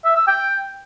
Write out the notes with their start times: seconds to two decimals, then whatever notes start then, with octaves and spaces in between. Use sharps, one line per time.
0.05 E5
0.16 E6
0.28 G5